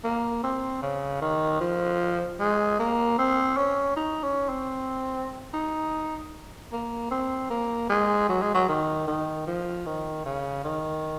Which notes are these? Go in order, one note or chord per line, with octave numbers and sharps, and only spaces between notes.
A#3
C4
C#3
D#3
F3
G#3
A#3
C4
C#4
D#4
C#4
C4
D#4
A#3
C4
A#3
G#3
F#3
G#3
F#3
D#3
D#3
F3
D#3
C#3
D#3